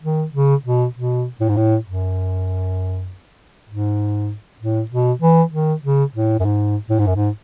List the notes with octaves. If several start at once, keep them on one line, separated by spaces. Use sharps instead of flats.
D#3
C#3
B2
B2
A2
G#2
A2
F#2
G#2
A2
B2
E3
D#3
C#3
A2
F#2
G#2
A2
G#2
F#2
G#2